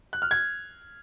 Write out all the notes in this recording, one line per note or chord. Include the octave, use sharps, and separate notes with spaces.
F#6
F6
G#6